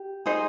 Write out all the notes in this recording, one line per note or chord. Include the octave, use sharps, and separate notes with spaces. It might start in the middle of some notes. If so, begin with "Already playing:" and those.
Already playing: G4
D#4 G#4 C5